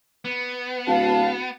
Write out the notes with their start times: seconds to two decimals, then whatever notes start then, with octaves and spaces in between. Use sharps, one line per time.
0.25 B3
0.87 D1 F#4 F5 A5